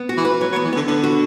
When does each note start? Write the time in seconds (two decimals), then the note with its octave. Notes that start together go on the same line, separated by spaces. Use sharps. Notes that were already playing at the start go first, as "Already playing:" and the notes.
Already playing: B3
0.09 F#4
0.17 E3
0.25 B4
0.41 F#3 B4
0.52 F#3
0.56 B3
0.64 E3
0.73 D3 B3
0.87 D3 B3
1.04 F#4